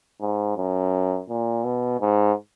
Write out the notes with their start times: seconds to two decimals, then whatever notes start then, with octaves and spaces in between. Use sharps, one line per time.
0.21 G#2
0.57 F#2
1.29 A#2
1.64 B2
2.01 G#2